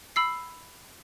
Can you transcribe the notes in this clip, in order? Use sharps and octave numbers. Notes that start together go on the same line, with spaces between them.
B5 E6 C7